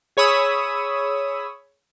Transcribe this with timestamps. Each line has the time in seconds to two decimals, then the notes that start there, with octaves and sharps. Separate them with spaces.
0.17 G#4 C#5 B5 D#6 E6